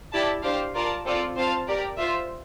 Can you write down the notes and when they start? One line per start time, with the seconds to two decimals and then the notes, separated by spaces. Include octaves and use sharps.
0.13 E4 G4 D5 A5
0.43 D4 G4 C5 F5
0.75 F4 A#4 D5 A5
1.06 C4 F4 A4 D5
1.37 C4 F4 C5 F5 A5
1.68 G4 A#4 D5
1.98 F4 C5 E5